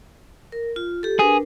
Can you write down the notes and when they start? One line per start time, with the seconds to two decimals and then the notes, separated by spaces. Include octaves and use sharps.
0.52 A#4
0.76 F4
1.03 G4 A4
1.19 D4 G#4 A#4 B4